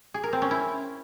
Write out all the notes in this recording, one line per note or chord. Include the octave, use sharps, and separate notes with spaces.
G#4
A#4
C4
C#4
E4